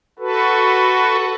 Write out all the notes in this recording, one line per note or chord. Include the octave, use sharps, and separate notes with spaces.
F#4 A4 B4